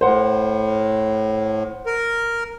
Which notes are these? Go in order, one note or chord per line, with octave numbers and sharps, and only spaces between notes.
A2 C5 F#5
A#4